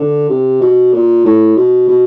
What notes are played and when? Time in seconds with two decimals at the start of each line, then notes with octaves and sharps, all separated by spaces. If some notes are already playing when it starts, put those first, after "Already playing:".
Already playing: D3
0.29 C3
0.61 B2
0.93 A#2
1.24 A2
1.56 B2
1.88 B2